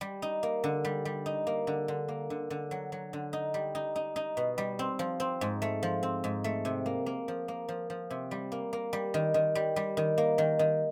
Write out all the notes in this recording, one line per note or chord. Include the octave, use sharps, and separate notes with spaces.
G3
D#4
A#3
D3
G3
G3
D#4
A#3
D3
D3
A#3
D3
D3
F#3
F#3
D3
D#4
G3
D#4
D#4
D#4
B2
G3
C4
F3
C4
G#2
A3
F3
C4
G#2
A3
C3
A#3
A#3
F3
A#3
F3
F3
C3
G3
A#3
A#3
G3
D#3
D#3
G3
G3
D#3
A#3
D#3
D#3